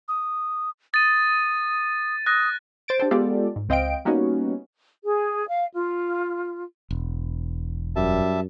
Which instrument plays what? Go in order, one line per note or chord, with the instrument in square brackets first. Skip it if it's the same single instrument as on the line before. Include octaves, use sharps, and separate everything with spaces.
[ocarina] D#6
[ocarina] D#6 [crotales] A6 D#7
[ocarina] D#6 [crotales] F#6 A#6
[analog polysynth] C5 A6 D7
D4 G4 A4 C5
G#3 B3 F4 G4 A4 D5
G#2
C#2 C4 D#5 F5 G5 D7
G3 A#3 B3 C#4 D#4 F#4
[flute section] G#4
F5
F4
[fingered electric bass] E1
[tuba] F#2 [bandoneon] G3 E5 A5